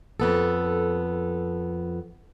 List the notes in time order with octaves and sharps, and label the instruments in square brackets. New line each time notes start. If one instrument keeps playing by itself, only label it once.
[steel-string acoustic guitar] F2 B3 A4